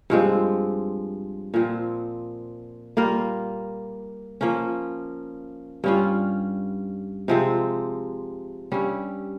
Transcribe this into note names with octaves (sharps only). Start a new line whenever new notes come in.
G2 F3 G#3 C4
A#2 F3 C4
G3 A#3 F4 A#4
F3 A#3 C#4
G2 G3 C#4 F4
C3 F3 G#3 C4
G2 G3 C#4